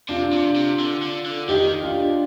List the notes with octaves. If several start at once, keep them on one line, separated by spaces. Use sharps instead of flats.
C3 D4 F4
C3
C3
D3
D3
D3
D#3 D#4 G4
D4 F4